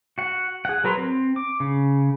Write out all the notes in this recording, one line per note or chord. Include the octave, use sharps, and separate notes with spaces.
F#4 F#5
G#4 F#5
F#3 A#4 B4 A#5 C6
C4
D6
C#3